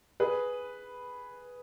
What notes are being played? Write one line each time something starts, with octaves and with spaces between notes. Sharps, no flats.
G#4 B4